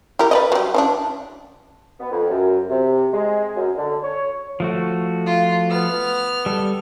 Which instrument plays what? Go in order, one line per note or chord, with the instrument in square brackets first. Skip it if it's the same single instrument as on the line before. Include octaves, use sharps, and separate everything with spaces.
[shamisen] E4 G4 A#4
B4 D5 D#5
F#3 G3
E3 C#4 D4
[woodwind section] B3
F2
F#2
C3
G#3
F#2
D3
C#5
[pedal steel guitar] F3 A3 F#4
[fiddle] F4
B3 F6
[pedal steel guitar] G3 A4